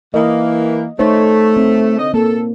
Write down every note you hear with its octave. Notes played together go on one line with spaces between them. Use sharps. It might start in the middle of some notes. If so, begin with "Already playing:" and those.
E3 A#3 D#5
A3 D#4 C5 C#5
C4
D3 D#4 D#5
A#3 A4